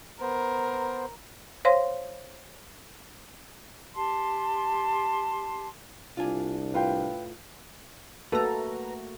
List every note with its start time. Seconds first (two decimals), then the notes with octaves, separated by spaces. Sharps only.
0.21 B3 A#4 C5
1.65 C5 C#5 F5 C6
3.96 G4 A5 C6
6.17 C2 D4 F4 G#5
6.74 A2 F4 B4 F5 G5
8.32 A3 A#3 F#4 A4 B4 A#5